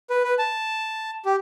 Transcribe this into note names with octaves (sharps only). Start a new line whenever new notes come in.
B4
B4
A5
G4